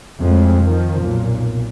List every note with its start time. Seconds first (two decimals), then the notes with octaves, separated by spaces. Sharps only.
0.19 F2 A2 G#3
0.63 D#3 F3
0.97 B1 A#2